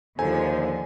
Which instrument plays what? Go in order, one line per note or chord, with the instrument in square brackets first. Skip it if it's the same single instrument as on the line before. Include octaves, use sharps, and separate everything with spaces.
[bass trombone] D#2 [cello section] D3 F3 [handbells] A4 C5 A#5 [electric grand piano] G#5